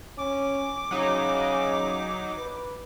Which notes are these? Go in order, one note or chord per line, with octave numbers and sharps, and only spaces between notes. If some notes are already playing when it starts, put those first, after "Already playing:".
C#4 D6
C#3 F#3 D#4
B4